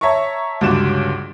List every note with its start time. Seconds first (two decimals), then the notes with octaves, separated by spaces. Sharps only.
0.01 C#5 E5 A5 A#5 C#6
0.61 C#2 G2 D3 F#4 D6 E7